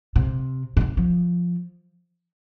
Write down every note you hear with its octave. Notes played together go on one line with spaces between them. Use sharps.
C3
A#2
C3
F3